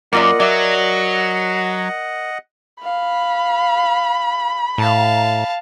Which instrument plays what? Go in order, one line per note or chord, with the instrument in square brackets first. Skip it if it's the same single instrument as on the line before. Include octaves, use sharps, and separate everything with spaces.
[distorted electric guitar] F#2 [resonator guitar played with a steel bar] A#3 F4 D5 [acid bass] A#4 [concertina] D#5 F#5
[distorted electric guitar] F#3 [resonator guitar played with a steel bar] D5 E5
[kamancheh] F5 [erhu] B5
[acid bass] A2 [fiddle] F5 A5